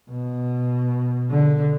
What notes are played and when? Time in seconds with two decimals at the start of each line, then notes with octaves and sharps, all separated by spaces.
0.11 B2
1.30 D3